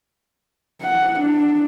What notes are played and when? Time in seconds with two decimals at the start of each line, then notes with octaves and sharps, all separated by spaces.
0.82 F#5
1.20 D4